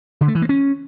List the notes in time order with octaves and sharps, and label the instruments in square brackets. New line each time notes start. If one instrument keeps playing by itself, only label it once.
[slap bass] D3
A3
E3
A#3
C#4